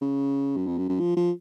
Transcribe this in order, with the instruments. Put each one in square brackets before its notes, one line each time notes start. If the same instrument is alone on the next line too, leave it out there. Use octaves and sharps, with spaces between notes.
[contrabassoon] C#3
F#2
F2
F#2
F#2
F3
F3